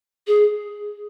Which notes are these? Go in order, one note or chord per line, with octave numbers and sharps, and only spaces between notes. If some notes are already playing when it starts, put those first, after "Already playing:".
G#4